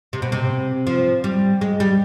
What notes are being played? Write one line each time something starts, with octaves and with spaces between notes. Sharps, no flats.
C3
B2
C3
F3
G3
G#3
G3